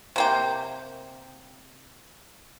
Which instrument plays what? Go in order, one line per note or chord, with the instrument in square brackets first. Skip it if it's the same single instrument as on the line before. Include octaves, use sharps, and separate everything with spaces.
[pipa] C3 A#3 G5